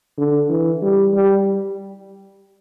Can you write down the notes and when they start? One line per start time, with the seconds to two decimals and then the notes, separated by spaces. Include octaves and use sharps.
0.18 D3
0.50 E3
0.82 G3
1.13 G3